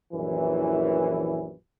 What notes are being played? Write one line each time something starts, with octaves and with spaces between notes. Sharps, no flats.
A#1 F#2 E3